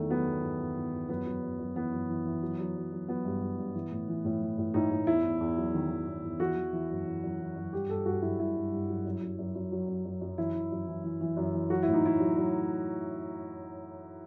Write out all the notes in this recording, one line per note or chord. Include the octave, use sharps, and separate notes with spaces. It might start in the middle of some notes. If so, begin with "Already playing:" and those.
Already playing: E2 D#3 A3
F#3 B3
E2
E2
E2
E2
E2
F#2 B3
F#2
F#2
F#2
E3 B3
F#2
E3
E3
F#3
F#3
F#3
F#3
F#3 B3
G2
G2
G2
E3
A2
E3
A2
E3
A2
A2 D#4
A2
E2 E4
E2
E2
F#3
D#3
D#3
E2
E2
E3 F#4
E3
E3
F#2
E3
F#2
E3
F#2
G2 G4
G2 A4
G2 F#4
F#3 E4
G2 E4
G2
G2
F#3
F#2
F#2
F#2
F#2
F#3
F#2
F#2
F#2
E3 E4
E3
F#2
E3
E3
E3
F#2
E3
F#3 F#4
E4
A2
D#4
A2 E4
F#3
F#3